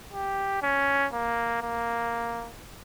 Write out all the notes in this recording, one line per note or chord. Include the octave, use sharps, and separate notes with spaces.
G4
C#4
A#3
A#3